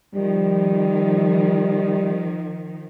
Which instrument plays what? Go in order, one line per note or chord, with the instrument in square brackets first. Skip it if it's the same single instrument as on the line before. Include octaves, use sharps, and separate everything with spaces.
[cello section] D#3 F3 [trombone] G3